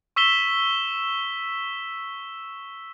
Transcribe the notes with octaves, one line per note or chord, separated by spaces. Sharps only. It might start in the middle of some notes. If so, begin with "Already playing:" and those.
C#6 E6 B6 E7 G7